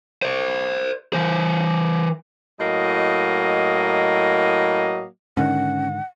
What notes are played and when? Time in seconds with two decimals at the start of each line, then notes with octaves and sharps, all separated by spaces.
0.22 C5 D5
1.13 E3 C5
2.59 A2 F#3 A#3 D#5
5.37 G#2 D3 D#3 C#4 F#5